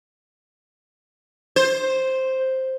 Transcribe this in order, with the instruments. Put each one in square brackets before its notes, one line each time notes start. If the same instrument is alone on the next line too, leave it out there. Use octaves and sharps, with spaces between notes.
[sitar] C5